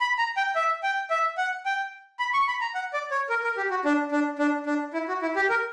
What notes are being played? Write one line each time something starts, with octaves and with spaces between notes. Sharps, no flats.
B5
A#5
G5
E5
G5
E5
F#5
G5
B5
C#6
B5
A#5
F#5
D5
C#5
A#4
A#4
G4
F#4
D4
D4
D4
D4
E4
F#4
E4
G4
A#4